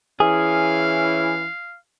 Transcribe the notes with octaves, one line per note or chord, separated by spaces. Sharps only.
E3 C#4 E4 G#4 F5